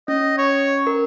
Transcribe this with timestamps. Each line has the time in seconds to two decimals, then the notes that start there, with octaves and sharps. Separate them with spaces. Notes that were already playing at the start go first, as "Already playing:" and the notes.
0.08 C#4 D#5
0.38 C#5
0.87 A#4